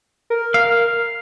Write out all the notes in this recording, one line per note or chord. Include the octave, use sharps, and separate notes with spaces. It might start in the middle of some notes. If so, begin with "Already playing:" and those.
A#4
F5